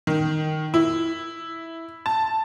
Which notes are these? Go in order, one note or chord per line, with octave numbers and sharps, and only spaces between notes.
D#3
E4
A5